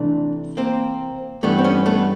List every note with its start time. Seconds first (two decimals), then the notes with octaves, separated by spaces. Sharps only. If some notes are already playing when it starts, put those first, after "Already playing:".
Already playing: C3 E3 A3 D4
0.57 A#3 C4
1.43 G2 E3 G3 A3 B3
1.58 C4
1.64 B3 C#4
1.86 A3 B3